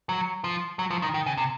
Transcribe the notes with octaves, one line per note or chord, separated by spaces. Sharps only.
F#3
F3
F#3
F3
D#3
D#3
C#3
C3